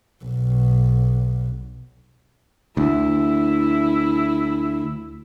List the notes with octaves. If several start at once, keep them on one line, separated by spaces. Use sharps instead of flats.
B1
D2 E4